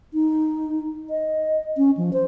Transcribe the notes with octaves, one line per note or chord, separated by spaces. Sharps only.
D#4
D#5
C#4
F3
C5